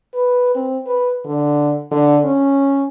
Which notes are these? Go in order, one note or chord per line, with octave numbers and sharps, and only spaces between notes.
B4
C4
B4
D3
D3
C#4